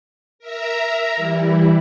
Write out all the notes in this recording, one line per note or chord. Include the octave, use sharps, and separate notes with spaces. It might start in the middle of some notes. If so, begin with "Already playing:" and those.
A#4 E5 A#5
E3 G3 E4